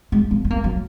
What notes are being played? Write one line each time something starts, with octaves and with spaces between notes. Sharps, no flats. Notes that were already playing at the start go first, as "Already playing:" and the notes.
G#3
A#3
B3
A#3
F#3